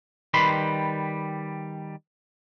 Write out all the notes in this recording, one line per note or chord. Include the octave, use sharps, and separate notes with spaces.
D#3 G3 B4 B5 C6